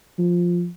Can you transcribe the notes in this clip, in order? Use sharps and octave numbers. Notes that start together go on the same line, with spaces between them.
F3